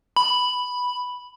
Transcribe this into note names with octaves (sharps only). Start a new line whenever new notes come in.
B5